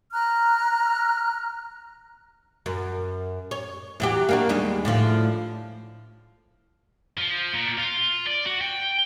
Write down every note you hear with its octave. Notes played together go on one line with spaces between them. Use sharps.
A#5 F6 F#6
F#2
C#5
E2 F#3 G4
A#3 D4 F#4
D#2 G3 G#3
A2 D3 F3
F3
A#2
F4
D5
F#4
G5